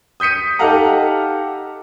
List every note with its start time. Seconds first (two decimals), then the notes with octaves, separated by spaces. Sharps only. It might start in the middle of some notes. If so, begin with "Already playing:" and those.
0.20 D#6 G6 B6 C#7 D#7
0.59 D#4 G4 A4 F5 F#5 A#5